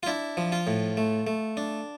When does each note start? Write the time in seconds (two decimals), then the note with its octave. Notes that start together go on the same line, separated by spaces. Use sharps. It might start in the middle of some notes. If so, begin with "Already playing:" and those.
0.03 F4
0.07 D4 E4
0.37 F3
0.52 F4
0.67 A2
0.97 A3
1.27 A3
1.57 D4